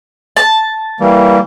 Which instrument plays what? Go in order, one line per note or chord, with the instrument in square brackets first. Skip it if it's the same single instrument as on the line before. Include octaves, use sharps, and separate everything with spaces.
[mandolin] A5
[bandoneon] E3 G3 A#3